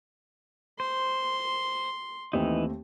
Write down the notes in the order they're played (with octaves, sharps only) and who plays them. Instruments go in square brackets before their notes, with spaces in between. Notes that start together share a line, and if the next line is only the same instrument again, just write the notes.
[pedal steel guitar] C5 [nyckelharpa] C6
[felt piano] D#2 A3 C4 [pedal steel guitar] E3 D#4